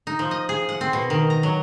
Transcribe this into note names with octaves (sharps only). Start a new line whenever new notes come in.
D#4
F3
D#5
G#4
F#5
C4
B2
D#3
A#5
F#3